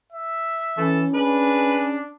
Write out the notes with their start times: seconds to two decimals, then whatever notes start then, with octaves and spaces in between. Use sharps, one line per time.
0.12 E5
0.78 E3 C#4 A4
1.14 D4 G#4 B4